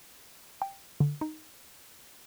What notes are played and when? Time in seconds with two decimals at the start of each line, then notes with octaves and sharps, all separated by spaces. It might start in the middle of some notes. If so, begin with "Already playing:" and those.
0.62 G5
1.00 D3
1.21 D#4